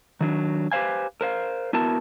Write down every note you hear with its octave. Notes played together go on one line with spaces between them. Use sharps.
D#3 F#3 D4
G4 B4 C5 F5 G#5
A#4 C5 F5
B3 E4 F#4 A#4 A5